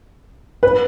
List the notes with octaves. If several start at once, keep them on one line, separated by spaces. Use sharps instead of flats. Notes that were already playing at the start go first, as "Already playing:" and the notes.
B4